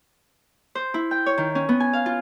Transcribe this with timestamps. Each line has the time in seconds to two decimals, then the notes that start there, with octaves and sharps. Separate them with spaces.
0.75 C5
0.94 E4
1.11 G5
1.26 C#5
1.38 D#3
1.55 C#4
1.69 B3
1.80 G#5
1.93 F5
2.06 F4